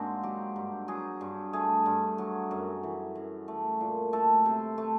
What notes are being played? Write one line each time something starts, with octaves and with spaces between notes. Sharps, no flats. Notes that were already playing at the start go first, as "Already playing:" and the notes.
Already playing: G#2 G#3 A#3 C4 D4 F#4
F#3 G4
G2
F#3 G#4
G2
A3 G#4
G2
F#3
F#2
E3
F#2
A3
A#2
A3 A4
C3
A3